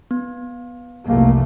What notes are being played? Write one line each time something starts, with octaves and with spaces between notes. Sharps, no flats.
B3
F1 C2 A3 A#3